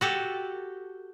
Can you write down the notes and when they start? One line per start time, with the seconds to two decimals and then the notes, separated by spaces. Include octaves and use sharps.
0.01 F#4 G4 A4